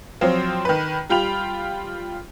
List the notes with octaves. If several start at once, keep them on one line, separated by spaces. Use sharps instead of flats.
F3 F#3 C4 F4 C5
D#3 B4
G3 F4 G5 B5 F7